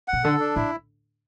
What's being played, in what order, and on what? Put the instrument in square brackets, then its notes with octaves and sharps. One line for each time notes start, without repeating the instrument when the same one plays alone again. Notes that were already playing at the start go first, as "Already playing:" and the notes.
[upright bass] B2 [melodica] F#5
[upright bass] D3 [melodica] A4
[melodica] D4
[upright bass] A2 [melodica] E4